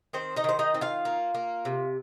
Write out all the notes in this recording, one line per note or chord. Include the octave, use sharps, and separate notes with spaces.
D#3 C4 C5
D#4 D#5
D#3 C5
D#4 D#5
C4
F4 F5
A#3
A#3
C3